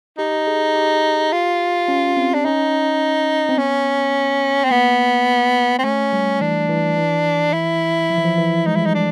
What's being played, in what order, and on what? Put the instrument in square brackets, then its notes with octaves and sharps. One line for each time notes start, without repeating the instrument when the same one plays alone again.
[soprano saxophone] D#4 [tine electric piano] G4
[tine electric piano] G#4
G4
[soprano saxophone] F4
[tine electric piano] C#4
C4
[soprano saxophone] D4
[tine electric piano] C#4 [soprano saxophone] D#4
[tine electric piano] C4
[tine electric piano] B3 [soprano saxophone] C#4
[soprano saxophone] C4
[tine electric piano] A#3 [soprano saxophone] B3
[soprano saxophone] C4
[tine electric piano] A3 [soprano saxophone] C#4
[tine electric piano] G3
[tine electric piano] E3 [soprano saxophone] D4
[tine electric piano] E3
E3
[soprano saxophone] E4
[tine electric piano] F3
E3
F3
E3
[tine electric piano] G#3 [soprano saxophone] D#4
[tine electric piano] G3 [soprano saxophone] E4
[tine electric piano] G#3 [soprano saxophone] D#4
[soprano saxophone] D4